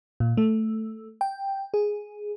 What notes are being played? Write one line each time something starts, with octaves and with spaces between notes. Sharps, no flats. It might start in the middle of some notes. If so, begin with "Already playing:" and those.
A#2
A3
G5
G#4